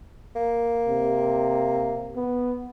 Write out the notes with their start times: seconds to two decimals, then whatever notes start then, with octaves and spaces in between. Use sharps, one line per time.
0.36 A#3
0.88 C3
2.16 B3